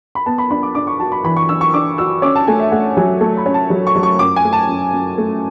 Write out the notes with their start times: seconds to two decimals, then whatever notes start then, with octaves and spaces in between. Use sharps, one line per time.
0.15 B5
0.26 B3 A5
0.38 B5
0.50 D4 B5
0.63 D6
0.75 D4 D6
0.87 C#6
1.00 F#4 A5
1.12 B5
1.24 E3 B5
1.36 C#6
1.49 D4 E6
1.61 C#6
1.74 D4 D6
1.98 F#4 E6
2.22 C#4 D6
2.36 A5
2.47 A3 G#5
2.60 E5
2.71 A3 F#5
2.97 F#3 G#5
3.21 A3 A5
3.37 B5
3.46 C#4
3.54 A5
3.70 F#3
3.87 C#6
3.96 F#3
4.03 C#6
4.19 F#2 D6
4.36 G#5
4.45 A3
4.53 A5
4.69 F#2
4.93 F#2
5.18 A3